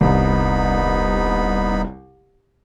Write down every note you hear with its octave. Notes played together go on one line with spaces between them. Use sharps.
D#1 C2 B3 D#4 B5